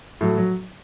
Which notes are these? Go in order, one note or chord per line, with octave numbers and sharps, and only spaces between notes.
A2 F#3
F#3